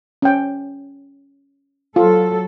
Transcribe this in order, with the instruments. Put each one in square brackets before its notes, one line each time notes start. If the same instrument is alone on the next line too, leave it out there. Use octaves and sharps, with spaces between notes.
[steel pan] C#4 G5
[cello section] F#3 A4 [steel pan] F4